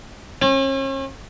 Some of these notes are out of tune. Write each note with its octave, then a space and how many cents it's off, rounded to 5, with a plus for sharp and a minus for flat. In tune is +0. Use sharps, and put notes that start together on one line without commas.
C#4 -40